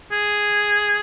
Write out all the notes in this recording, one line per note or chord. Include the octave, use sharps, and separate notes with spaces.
G#4